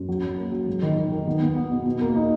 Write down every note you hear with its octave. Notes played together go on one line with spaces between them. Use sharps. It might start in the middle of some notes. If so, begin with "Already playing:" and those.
Already playing: F#2
F#3
C#4
A#3
F#3
G#2
D#3
D#3
D#3
B3
B3
B3
B2
B2
A#3
D#4